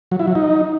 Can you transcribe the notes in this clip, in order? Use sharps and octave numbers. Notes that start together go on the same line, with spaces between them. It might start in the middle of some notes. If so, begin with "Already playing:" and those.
F#3
E4
F#3
D#4